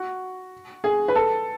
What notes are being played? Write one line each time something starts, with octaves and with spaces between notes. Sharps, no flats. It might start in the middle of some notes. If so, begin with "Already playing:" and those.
Already playing: F#4
G#4
B4
A4